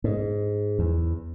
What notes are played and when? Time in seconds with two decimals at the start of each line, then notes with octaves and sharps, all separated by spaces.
0.04 G#2
0.79 E2